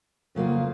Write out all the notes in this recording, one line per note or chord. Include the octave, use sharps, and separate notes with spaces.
F2 C#3 F#3 A#3 F4